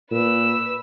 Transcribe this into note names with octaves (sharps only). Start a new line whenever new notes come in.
A#2 B4 E6